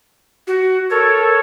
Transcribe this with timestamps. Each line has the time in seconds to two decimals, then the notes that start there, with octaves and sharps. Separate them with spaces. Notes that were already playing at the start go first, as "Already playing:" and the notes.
0.47 F#4
0.90 A4 A#4 C#5